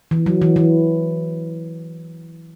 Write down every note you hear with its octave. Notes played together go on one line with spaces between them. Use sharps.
E3
F#3
E3
E3